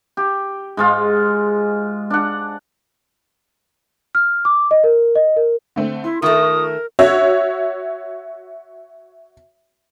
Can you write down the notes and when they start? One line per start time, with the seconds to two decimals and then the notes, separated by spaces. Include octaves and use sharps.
0.17 G4
0.77 G#2 G#3 F4
2.10 D4 F#5
4.15 F6
4.45 D6
4.71 D#5
4.84 A#4
5.15 D#5
5.37 A#4
5.76 D3 A3 C4
6.04 E4 C6
6.22 D#3 A3 F4 A#4 E5 C#6 D#6
6.99 F#4 C#5 E5